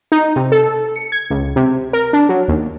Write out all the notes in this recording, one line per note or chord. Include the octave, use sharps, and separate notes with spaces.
D#4
C3
A4
C#7
G#6
C#2
C3
A#4
D4
F#3
D#2